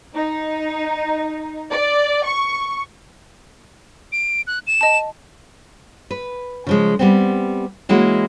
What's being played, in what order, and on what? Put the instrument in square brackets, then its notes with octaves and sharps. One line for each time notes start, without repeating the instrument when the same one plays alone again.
[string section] D#4
D5
C#6
[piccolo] D7
F#6
E7
[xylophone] D#5 A5
[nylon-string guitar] B4
C#3 F3 G#3
G3 B3 C4
E3 G#3 A#3 C#4 E4 F#4